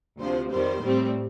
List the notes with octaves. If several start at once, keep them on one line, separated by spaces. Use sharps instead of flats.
D2 C3 F3 C5
F2 D#3 G3 C5
A2 G3 C4